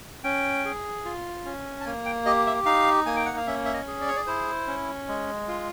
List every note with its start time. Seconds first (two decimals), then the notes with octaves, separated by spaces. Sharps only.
0.24 C#4 G5
0.65 G#4
1.05 F4
1.45 C#4
1.80 A5
1.85 A#3 G#5
2.05 G5
2.26 G4 D#5
2.47 E5
2.66 D#4 F5
3.06 A#3 G#5
3.16 G5
3.26 F#5
3.37 F5
3.47 C#4 E5
3.65 E5
3.74 D#5
3.88 G#4
4.01 D5
4.08 C#5
4.16 D5
4.27 E4 C5
4.67 C#4
5.08 G#3
5.48 F4